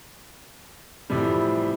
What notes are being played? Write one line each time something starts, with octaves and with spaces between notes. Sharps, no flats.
A2 C3 E3 F3 G3